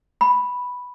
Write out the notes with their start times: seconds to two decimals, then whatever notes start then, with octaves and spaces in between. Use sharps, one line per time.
0.21 B5